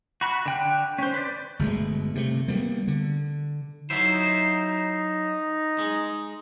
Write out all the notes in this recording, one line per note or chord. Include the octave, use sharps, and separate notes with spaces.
F#4 B5 F#6
D3 G5 F#6
C#4 C5
B4 D5
G1 B2 G#3 A3
C3 A3
D2 G3 A#3 B3
D3
F#3 D#4 E4 C5
G#3